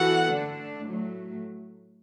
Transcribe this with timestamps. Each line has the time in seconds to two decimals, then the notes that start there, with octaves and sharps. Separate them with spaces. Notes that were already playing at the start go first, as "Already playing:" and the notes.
Already playing: E3 B3 F#4 A4 F#5
0.31 D3 A3 D4
0.83 A2 F#3 A3